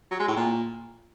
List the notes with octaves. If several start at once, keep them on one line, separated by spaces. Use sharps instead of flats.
F#3
G#3
A2
A#2